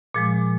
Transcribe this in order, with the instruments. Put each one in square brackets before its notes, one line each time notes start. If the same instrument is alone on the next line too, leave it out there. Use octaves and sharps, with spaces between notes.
[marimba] A#2 F3 G#3 G#4